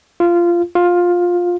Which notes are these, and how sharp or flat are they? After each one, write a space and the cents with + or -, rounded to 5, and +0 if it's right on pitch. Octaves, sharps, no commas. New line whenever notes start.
F4 -15
F4 +15